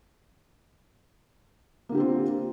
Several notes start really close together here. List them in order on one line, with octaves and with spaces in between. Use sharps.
A#3 D3 G4 C4 F4